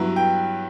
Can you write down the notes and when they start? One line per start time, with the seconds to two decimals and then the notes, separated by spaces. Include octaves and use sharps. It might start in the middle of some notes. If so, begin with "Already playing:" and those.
Already playing: G2 F#3 B3 E4
0.16 G5